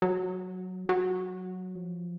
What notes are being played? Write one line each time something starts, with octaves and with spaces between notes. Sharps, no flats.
F#3
F#3
F3